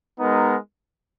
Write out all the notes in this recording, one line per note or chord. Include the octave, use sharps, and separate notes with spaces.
G#3 B3 D#4 A#4